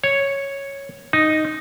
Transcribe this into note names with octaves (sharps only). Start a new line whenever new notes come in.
C#5
D#4